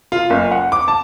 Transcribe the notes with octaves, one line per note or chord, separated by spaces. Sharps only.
F4
F#1
F#5
D6
A5